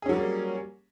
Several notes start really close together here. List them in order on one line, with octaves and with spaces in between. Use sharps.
G#4 C#4 F#3 G3 A#3